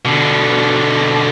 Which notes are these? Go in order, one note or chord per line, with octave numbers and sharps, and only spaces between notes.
B2 D3